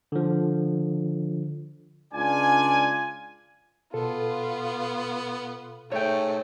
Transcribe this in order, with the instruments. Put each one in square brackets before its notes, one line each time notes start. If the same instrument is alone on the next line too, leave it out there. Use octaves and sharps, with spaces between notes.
[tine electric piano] D3 F3
[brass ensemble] C#2 D4 F4 D5 G#5
[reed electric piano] B2 A4 [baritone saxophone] B3 [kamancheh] F4
[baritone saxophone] G#2 [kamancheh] A3 [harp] C#5 G5